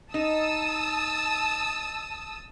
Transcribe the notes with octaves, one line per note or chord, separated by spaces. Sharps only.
D#4 A5 D#6 E6